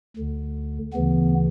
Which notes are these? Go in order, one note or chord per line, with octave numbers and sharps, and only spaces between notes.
D2 D3
D2 C#3 E3 B3